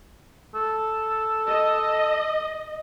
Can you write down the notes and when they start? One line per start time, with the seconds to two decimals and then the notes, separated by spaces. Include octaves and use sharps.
0.55 A4
1.48 D#5